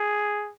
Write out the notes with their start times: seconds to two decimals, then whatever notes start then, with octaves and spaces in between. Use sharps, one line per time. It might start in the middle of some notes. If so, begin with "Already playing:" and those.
Already playing: G#4